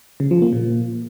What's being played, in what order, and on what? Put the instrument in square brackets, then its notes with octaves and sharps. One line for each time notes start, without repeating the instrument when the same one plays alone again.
[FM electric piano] C#3
F3
A#3
A#2